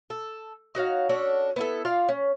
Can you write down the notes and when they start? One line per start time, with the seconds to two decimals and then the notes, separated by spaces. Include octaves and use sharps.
0.10 A4
0.75 D#4 F#4 C#5 F5
1.09 C#4 D4 F#4 A4
1.56 B3 E4 A4
1.85 F4 D5 F5
2.09 C#4